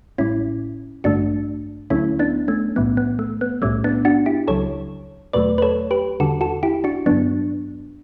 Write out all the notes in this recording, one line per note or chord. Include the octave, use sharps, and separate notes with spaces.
A1 A2 G3 C#4 E4
A1 G2 D3 A3 D4 F#4
D2 D3 F#3 A3 C#4 E4
B3 D4
A3 C#4
B1 A2 E3 G3 B3
B3
A3
B3
B1 A2 G3 A3 C#4
B3 D4
D4 F#4
E4 G4
C#2 C#3 F#3 A4 C#5
E2 B2 F#3 A3 B4 D5
B4
A4 C#5
G4 B4
E2 D3 G3 F#4 A4
F#4 A4
E4 G4
D4 F#4
G2 D3 F#3 B3 D4